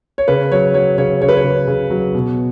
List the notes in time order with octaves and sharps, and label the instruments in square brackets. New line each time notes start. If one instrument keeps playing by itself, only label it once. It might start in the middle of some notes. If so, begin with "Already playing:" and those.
[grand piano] C#5
C#3 B4
F#3 C#5
F#3 C#5
C#3 C#5
C#3 C#5
B4
C#5
C#3
C#3
F#3
B2